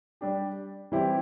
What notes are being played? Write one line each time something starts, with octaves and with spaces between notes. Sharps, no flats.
G3 D4 G4
E3 G3 C4 E4 G4